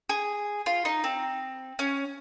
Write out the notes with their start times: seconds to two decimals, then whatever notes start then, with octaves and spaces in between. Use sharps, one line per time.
0.09 G#4
0.66 F4
0.85 D#4
1.04 C4
1.79 C#4